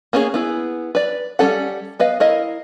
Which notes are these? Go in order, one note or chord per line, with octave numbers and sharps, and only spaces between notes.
A#3 B3 C#4 D4 G#4
B3 E4 G#4
B4 D5
G3 C#4 A4 F#5
B3 B4 D#5 F5
E4 A#4 D#5 F5